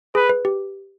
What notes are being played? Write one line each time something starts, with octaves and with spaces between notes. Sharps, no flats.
G#4 B4
B4
G4